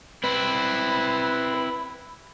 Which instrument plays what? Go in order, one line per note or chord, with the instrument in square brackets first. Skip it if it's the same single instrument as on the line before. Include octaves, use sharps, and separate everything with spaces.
[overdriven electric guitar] C4 E4 [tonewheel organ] B4 [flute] B5